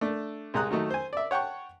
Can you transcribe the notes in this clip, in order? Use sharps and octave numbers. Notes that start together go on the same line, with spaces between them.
A3 D4
C2 G#3 A#5 D#6 F#6
D#3 F#3 A3 D#4
C5 G#5
D5 E5
C#5 F#5 G5 A5 C#6